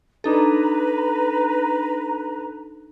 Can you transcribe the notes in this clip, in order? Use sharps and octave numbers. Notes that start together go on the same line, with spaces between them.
D4 D#4 A4 B4 A#5